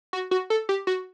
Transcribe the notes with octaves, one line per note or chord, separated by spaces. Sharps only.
F#4
F#4
A4
G4
F#4